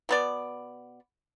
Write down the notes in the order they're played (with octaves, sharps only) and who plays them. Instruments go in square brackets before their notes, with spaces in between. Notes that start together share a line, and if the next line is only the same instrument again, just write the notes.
[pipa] B2 B3 D5